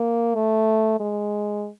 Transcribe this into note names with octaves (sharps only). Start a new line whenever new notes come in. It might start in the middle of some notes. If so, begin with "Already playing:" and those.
Already playing: A#3
A3
G#3